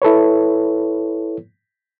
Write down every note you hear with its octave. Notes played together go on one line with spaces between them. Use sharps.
E4 A4 B4 C#5